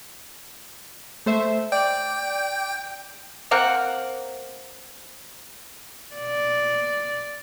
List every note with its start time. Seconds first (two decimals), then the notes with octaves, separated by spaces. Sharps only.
1.26 A3 C5 E5
1.72 D5 G5
3.51 A#3 C4 A#4 F#5
6.15 D5